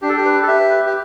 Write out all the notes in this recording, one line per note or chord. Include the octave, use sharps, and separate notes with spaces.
D4 G4
A4
G4
B4
A4
G4 E5
B4
G4